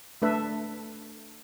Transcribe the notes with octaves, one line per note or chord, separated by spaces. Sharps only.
A3 D4 A4 B4 E5